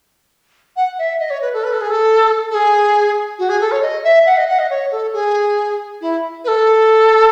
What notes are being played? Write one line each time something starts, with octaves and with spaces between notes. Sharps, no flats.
F#5
E5
D#5
C#5
B4
A4
B4
A4
G#4
A4
A4
G#4
F#4
G#4
A4
C#5
D#5
E5
F#5
D#5
F#5
D#5
C#5
A4
G#4
E4
B4
A4